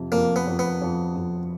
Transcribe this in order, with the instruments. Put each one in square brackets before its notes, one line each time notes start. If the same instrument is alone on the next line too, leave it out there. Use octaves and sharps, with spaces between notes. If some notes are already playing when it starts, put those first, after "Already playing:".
Already playing: [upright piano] F2 C3
[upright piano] F2 [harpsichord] A#3
[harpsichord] B3
[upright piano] F2
[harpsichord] B3
[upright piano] F2
F2